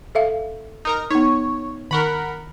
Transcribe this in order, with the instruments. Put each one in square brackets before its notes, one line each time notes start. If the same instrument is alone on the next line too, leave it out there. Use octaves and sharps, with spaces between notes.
[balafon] A4 E5 F5
[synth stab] D#4 A#4 A#5
[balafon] B3 D#4 [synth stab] C#5
[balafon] D#3 C#6 [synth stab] A#4 F#5 B5